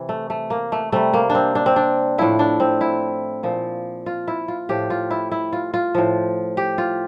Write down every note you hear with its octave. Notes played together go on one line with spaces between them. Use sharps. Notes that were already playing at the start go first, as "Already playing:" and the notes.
Already playing: C3 E3
A3
A3
A#3
A3
C3 G3 A3
A#3
D4
C4
D4
C4
D4
A2 F3 E4
D4
C4
E4
A#2 F3
F4
E4
F4
A2 F3 G4
F4
E4
E4
F4
F4
A2 F3
G4
F4